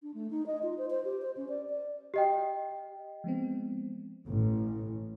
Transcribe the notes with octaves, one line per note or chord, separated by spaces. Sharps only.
D4
A3
D#4
D#5
F4
C5
C5
G4
C5
C#4
D5
D5
G4 D#5 G5
F3 G#3 B3 C4
A1